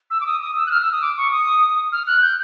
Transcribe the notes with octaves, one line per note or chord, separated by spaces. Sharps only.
E6
D6
D#6
D#6
E6
F#6
F6
E6
D#6
D6
C#6
D#6
F6
F#6
G6